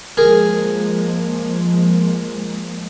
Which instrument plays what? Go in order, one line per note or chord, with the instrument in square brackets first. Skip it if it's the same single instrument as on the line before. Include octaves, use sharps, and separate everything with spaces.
[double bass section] F3 G#3 A#3 [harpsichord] G#4 A#4